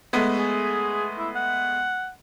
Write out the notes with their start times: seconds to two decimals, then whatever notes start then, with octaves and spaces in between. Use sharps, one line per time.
0.13 G#3 A3 B3
0.38 G#4
1.18 E4
1.35 F#5